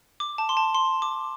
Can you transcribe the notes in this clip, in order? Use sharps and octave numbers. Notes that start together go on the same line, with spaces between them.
D6
A5
C6
A5
C6
D6